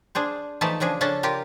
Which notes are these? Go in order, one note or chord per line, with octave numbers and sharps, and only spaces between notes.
D4 G#4 C5
E3 F3 A3 D#4 E4 A5
C#3 F3 D4 G#4
C#3 C#4 D4 A4 A5
F4 G4 A#4